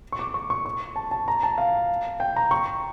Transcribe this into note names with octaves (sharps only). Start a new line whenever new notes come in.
C#6
D6
C#6
C#6
C#6
A5
A5
A#5
A5
F5
G5
A#5
C#6